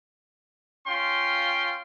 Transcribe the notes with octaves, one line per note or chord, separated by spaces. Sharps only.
C#4 F4 G5 C6